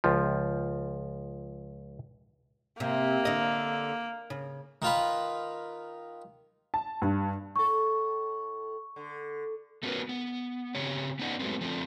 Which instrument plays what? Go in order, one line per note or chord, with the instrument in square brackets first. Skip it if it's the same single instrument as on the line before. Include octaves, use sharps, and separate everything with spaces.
[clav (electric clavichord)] C#2 F3
[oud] C3 [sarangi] A#3
[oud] D3 D#5
C#3
[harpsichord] D#3 F4 B4
[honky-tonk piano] A5
G2
[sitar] A2 A4 [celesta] C#6
[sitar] D3
[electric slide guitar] A3 B3 C#4 F#4 A#4 B4
B3
C#3 C4 G4 C#5
B3 C#4 D#4 D5 F#5
F#3 G#3 A3 B3 C4
F3 A3 C4 D4